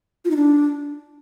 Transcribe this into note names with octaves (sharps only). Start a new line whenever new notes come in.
F4
D#4
D4